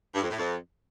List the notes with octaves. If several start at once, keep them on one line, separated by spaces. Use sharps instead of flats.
G2
F2
A2
F2